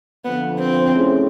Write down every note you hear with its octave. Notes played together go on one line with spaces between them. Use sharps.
F2 D3 F3 B3
C4
A3 C#4 E4 G#4